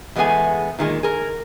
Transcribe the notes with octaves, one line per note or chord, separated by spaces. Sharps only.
E2 G#3 A3 B3 G#4 G#5
A#2 D#3 G#3
G#4 A#4